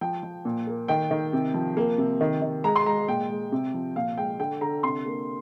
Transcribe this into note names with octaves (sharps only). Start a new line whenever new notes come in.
F3 G5
F3
A#2
A#3
D#3 G5
D#3
C3
F3
A#3
C3
D#3
D#3
G#3 A#5
C6
G#3 A#5
A#2 G5
G#3
C3
F3
A#2 F5
G#3 G5
D3 G5
D3 A#5
C3 C6
A#3